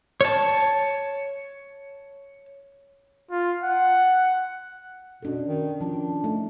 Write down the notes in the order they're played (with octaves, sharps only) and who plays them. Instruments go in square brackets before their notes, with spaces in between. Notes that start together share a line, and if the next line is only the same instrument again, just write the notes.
[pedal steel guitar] C#5 A5
[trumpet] F4
F#5
[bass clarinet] B2 [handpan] C#4 D4 A4
[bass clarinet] D#3
[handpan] F3 C#4 [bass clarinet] D4
[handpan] A3 D#4